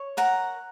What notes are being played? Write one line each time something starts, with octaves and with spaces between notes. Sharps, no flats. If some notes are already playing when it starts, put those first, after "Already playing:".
Already playing: C#5
A#4 F#5 A#5